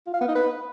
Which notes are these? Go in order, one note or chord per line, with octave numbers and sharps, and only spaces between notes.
F4
F5
B3
D#4
B4